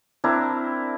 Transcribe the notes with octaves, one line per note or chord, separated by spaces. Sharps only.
C4 D4 E4 A#4